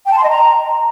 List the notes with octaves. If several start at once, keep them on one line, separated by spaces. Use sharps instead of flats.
G5
A5
C6
D#5
A#5